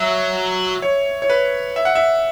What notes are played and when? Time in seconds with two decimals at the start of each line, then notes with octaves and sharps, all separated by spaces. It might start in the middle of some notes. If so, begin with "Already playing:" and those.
Already playing: F#3 E5
0.82 C#5
1.22 C#5
1.30 B4
1.76 E5
1.85 F#5
1.95 E5